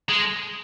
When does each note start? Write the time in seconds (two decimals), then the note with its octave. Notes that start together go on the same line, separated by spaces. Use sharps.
0.09 G#3